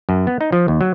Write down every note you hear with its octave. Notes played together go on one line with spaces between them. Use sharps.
F#2
B3
D#4
F3
D#2
F#3